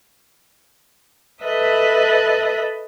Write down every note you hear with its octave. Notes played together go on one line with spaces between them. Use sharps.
A4 B4 D#5 E5